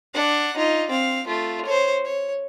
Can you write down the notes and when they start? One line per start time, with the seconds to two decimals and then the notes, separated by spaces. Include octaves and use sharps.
0.14 D4 F#5
0.56 D#4 F4
0.90 C4 F5
1.27 A3 F4
1.65 C5 C#5
2.05 C#5